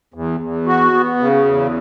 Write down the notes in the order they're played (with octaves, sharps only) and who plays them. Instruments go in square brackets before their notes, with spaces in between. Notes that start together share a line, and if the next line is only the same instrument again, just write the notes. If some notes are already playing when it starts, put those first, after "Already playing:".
[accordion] E2
E2
F#4
B3
C#3
E2